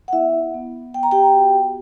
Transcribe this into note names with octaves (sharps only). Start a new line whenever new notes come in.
F#5
B3 E4 E5
B3
B3 G5
A#5
G4 G5
F#4